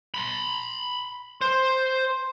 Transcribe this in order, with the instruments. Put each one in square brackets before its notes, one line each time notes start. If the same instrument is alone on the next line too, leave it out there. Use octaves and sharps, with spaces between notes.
[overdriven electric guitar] B5 C6
[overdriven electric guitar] C5 [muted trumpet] C6